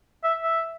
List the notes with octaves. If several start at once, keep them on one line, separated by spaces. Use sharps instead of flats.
E5
E5